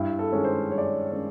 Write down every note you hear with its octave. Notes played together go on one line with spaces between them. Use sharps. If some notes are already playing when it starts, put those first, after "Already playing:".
Already playing: G2 E4
A4
D#3 G#3 C#4
C5
G2 C#5
D5
C#5
D#3 G#3 C#4